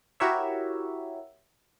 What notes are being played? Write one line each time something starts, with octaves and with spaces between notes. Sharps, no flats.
E4 F#4 G4 A#4 C#5 E5